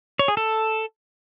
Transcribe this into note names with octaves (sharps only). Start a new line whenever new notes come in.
C#5
G#4
A4